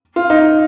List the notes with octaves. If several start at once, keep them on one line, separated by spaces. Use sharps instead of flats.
F4
D#4